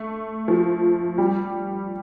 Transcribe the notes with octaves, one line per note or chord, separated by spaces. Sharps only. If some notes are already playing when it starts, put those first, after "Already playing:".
Already playing: A3
F3
G3